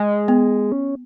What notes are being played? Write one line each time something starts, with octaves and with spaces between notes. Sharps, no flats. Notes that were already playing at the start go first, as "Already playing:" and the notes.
Already playing: G#3
B3
C#4